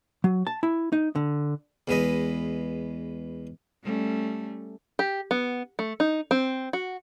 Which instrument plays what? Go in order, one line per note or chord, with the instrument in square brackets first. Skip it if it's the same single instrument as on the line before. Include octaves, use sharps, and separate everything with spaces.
[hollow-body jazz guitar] F#3
A5
E4
D#4
D3
[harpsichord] E2 G#3 B4 D#5
[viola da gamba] G3 A3 C#4
[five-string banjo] G4
B3
A3
D#4
C4
F#4